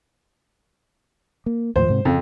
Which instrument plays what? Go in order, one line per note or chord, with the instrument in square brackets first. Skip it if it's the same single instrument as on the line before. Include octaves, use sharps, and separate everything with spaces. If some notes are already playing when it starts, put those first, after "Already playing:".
[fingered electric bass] A#3
[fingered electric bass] D#2 A2 F3 [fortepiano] C5
[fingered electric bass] G#2 C3
[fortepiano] F2 [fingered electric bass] C#3 F3